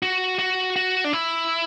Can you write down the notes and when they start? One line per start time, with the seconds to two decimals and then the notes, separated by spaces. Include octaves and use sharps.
0.03 F#4
0.39 F#4
0.76 F#4
1.04 D4
1.13 E4